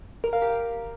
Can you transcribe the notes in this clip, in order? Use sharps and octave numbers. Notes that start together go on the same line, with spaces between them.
A#4
F5
G4